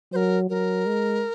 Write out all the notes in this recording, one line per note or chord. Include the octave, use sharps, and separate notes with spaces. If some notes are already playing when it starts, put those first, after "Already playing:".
F#3 A#4 C5
F#3 A#4
G#3